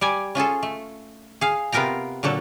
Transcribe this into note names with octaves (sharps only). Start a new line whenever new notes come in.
G3 D5 G#5
C#4 F4 G#4 A4
A3
G#4 F5
C3 B3 F4 A#4 G5 A#5
A#2 D3 F#3 A4